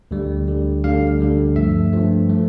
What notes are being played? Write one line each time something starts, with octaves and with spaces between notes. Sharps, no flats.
D2 D3 G3
D2 D3 G3
D2 D3 G3 F5
D2 D3 G3
G2 F3 A3 E5
G2 F3 A3
F3 A3